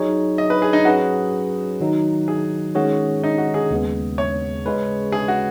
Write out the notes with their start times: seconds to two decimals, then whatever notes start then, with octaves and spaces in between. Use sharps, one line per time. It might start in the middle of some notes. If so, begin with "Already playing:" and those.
Already playing: F#3 D#4 G#4 C#5
0.38 D#5
0.50 B4
0.62 G#4
0.73 D#4
0.85 F#3 C#4 F#4 G#4 B4
1.80 D#3 F#3 D#4
2.28 G#4
2.75 D#3 G#3 C#4 F#4 G#4 C#5
3.23 D#4
3.38 F#4
3.54 G#4
3.71 D#2 C#3 G#3 B3
4.18 C#5
4.66 C#3 G#3 C#4 B4
5.12 G#4
5.28 F#4